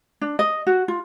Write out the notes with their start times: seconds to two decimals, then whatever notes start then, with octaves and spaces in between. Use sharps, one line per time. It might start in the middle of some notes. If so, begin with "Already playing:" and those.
0.21 D4
0.39 D#5
0.67 F#4
0.88 F4